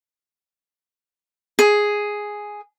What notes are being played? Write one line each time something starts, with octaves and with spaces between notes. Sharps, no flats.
G#4